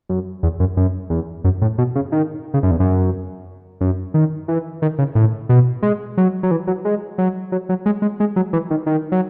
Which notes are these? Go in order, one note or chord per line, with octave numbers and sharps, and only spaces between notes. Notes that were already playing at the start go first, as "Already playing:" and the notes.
F#2
E2
F#2
F#2
E2
F#2
A2
B2
C#3
D#3
C#3
F#2
E2
F#2
F#2
D#3
E3
D#3
C#3
A2
B2
G#3
F#3
F#3
E3
F#3
G#3
F#3
F#3
F#3
G#3
G#3
G#3
F#3
E3
D#3
D#3
F#3